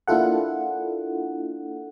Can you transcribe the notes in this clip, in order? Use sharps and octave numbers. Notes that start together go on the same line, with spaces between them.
A#3 D4 E4 F4 A4 F#5